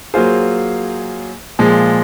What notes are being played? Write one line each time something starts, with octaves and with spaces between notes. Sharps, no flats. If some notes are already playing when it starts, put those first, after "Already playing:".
F#3 A#3 F4 G#4 C5
A#2 F3 G#3